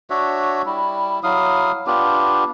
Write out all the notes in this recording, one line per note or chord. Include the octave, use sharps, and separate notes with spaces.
D4 F#4 C#5 E5
G3 E4
F#3 E4 F5 D#6
B3 D4 F4 G4